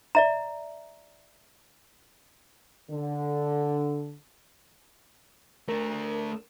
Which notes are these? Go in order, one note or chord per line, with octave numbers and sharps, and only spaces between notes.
D5 E5 A#5
D3
A3 D4 A#4